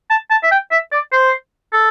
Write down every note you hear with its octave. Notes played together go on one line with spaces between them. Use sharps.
A5
A5
E5
G5
E5
D5
C5
A4